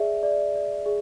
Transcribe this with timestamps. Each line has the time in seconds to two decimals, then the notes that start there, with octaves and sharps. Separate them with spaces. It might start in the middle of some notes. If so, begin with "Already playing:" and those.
Already playing: G#4 D5 E5
0.23 D5
0.55 D5
0.86 G#4